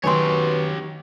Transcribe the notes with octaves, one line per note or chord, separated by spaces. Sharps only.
F#2 B2 D#3 F#3 G4 C#5 G#5 C6